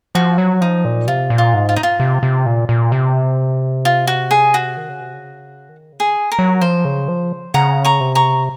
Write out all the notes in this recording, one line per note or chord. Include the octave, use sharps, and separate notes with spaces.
F3 F#4
F#3
F3 D#4
A#2
C3 F4
A#2
F4
G#2
F4
D#4
F4
C3
C3
A#2
A#2
C3
F4
F#4
G#4
F#4
D#3
C#3
C3
C#3
D#3
C#3
G#4
A#4
F#3
F3 C5
C#3
F3
C#3 F#5 A#5
A#5 C#6
C3
A#5 C#6